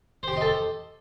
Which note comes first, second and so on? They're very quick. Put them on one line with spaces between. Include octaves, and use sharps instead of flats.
C5 G4 C6 D#5 A4